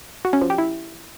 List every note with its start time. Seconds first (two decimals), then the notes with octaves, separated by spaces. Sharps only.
0.25 F#4
0.33 C#4
0.42 F3
0.50 G4
0.58 E4